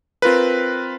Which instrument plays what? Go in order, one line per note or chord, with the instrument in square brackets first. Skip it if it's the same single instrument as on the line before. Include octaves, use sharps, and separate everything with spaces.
[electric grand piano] C4 F4 A#4 B4